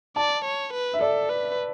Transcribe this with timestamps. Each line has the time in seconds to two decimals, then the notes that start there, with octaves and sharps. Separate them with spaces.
0.16 D5 A5
0.44 C#5
0.73 B4
0.93 E5
1.01 A4 D5
1.29 B4